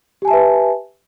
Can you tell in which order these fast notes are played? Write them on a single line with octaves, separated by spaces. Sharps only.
G4 G#5 A5 E5 B4